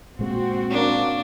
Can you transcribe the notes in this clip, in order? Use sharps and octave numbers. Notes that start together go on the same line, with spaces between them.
A#2 G#3 C4 F#4
A#3 D4 C#6